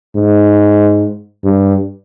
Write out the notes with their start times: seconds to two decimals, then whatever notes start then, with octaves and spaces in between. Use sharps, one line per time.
0.16 G#2
1.44 G2